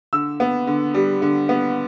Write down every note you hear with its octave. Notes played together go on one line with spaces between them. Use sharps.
D3 E6
B3
D3
G3
D3
B3